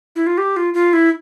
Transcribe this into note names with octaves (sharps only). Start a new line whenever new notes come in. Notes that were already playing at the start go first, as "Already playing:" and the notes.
E4
F4
G4
F4
F4
E4